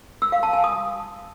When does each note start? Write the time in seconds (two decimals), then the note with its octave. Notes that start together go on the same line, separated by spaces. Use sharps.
0.22 E6
0.32 F5
0.43 A5
0.53 G#5
0.64 D#6